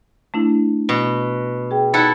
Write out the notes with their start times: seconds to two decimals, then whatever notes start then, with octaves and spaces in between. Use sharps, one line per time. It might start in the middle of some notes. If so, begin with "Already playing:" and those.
0.34 A3 D4 E4
0.89 B2
1.71 G#4 G5
1.94 D#4 E4 A4 F#5